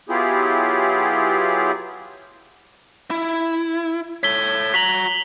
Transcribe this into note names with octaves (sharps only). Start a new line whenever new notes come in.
F#3 B3 E4 F4 G4 G#4
E4
A4 C#5 B6 G7
F#4 A#5 B6 F7 F#7